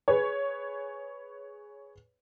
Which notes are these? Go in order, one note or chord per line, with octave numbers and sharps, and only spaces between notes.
G#4 B4 C#5